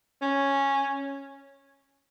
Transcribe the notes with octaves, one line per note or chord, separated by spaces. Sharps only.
C#4